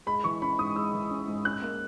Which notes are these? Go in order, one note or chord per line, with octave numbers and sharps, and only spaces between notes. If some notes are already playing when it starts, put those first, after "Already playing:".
G#3 B5
E3 C#6
C#4 B5
G#2 D#6
G#3 E6
E3
C#4
G#2
C#4 F#6
A#3